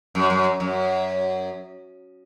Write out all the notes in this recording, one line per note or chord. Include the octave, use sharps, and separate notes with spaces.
F#2
F#2
F#2